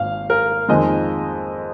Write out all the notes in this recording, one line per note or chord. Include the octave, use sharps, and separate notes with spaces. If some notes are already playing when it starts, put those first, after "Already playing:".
Already playing: G#1 F5
A#4
F2 D#3 G#3 D#5